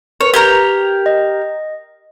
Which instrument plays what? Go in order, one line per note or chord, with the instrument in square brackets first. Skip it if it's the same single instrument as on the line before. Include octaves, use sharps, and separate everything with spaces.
[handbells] A#4 B4 [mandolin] C#5
[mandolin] G4 A#4 A#5 [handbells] G#6
[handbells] D#5